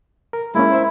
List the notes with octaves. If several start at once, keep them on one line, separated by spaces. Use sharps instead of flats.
A#4
G#3 A#3 C#4 E4
C5 E5